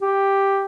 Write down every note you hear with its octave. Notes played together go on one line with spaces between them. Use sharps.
G4